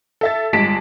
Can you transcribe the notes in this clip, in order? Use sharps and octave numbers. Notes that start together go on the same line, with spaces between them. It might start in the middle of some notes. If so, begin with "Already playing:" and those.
A4 E5 A6
G1 G2 G#3 A5 B6 D7